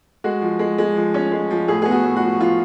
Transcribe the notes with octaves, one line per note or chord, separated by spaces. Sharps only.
G#3 F#4
F3
G#3
G#3
F3
C#4
G#3
F3
A2 G#4
B3 G#4
F#4
A2
F#4
F3
F3 F4